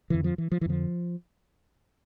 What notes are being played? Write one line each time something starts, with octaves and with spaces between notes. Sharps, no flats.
F2 D3 E3
F3
E3
F3
E3
F2 D3 F3